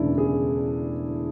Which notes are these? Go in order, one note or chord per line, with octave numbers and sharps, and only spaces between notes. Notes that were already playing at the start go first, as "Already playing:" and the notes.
Already playing: E1 D2 C#3 E3 D4 E4
G#4